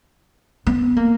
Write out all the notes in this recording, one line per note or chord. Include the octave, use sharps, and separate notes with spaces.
B3
A#3